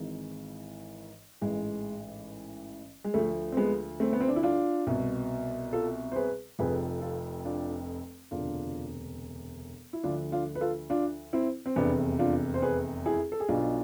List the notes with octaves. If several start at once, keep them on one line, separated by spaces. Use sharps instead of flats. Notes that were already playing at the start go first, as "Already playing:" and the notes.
Already playing: G#1 G#2 E3
A1 G#2 E3 G#3
G#3
D2 D3 F3 A3
C4
G#3 B3
A3 C4
B3
C4
D4
E4
D4 F4
C2 B2
F4 A4
C5
G#4 B4
F1 F2 C3 F3 G#4 B4
F4 A4
D4 F4
E1 D2 C3 D4 F4
E4
D2 D3 F3 D4 F4
D4 F4
B4
F4 A4
D4 F4
C4 E4
C4
F1 E2 C3 B3 D4
D4 F4
C5
G#4 B4
E4 G#4
A4
G#4
B1 B2 D4 F4